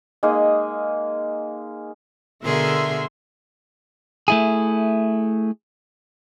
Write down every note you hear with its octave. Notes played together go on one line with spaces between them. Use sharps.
G#3 A#3 D#4
B2 D3 G#4 A#4 E5 C6
A3 E4 G#4